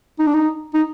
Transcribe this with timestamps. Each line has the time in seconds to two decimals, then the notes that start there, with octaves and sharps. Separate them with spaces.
0.19 D#4
0.27 D4
0.34 D#4
0.74 D#4